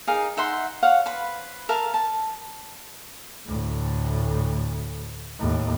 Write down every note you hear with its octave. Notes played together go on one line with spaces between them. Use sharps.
D#4 G#4 A#4 F5
D#4 E5 F#5 C6
C#5 F5 F#5
B4 C5 B5
A#4 E5 F5 A5
A5
D2 A2
D#2 A2